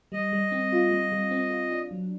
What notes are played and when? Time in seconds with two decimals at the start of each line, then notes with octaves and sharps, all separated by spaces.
0.12 G3 D#5
0.33 G3
0.52 C4
0.72 F4
0.91 G3
1.12 G3
1.31 C4
1.50 F4
1.71 D4
1.91 F#3